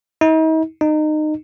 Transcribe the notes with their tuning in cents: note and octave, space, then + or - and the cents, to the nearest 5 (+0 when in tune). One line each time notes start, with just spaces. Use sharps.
D#4 +40
D#4 -25